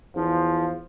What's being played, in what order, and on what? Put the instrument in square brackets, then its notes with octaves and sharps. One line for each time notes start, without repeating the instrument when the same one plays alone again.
[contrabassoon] E2 [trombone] F3